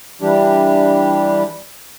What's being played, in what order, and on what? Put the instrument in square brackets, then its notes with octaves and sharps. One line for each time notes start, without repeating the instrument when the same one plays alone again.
[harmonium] E3 G3 D4 G4